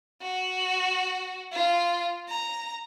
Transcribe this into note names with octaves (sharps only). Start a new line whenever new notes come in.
F#4
F4
A#5